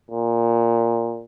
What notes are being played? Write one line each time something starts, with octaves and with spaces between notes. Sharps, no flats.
A#2